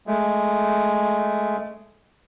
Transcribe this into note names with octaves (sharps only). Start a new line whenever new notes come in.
G#3 A3